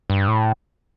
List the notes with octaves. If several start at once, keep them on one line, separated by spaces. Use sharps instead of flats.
G2
A2